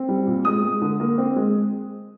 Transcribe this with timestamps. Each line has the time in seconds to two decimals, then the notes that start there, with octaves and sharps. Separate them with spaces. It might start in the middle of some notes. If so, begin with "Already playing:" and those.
Already playing: C4
0.09 G3
0.27 A#2
0.45 G#3 D#6
0.63 G#3
0.82 D3
1.00 A#3
1.18 C4
1.36 G#3